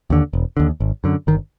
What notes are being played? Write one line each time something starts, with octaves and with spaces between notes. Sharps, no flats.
D#2 D3
E1
D#2 D3
G#1
F#2 D3
G1 D#3